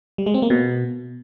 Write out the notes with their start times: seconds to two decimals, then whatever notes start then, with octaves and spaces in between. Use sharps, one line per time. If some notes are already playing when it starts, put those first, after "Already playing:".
0.18 G3
0.26 G#3
0.34 C4
0.42 A#3
0.50 B2